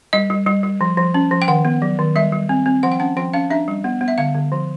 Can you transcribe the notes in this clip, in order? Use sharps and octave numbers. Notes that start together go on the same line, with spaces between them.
G3 D#5
G3
G3
G3
F3
F3
C#4
F3
G5
D#3 F#5
B3
F#3
D#3
G3 E5
G3
C4
C4
F3 F#5
G5
C#4 F#5
F3 G5
C#4 F5
D4 E5
G3
B3
B3
E5
D3 F5
D3
F3